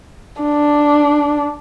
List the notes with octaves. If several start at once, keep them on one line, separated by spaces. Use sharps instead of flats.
D4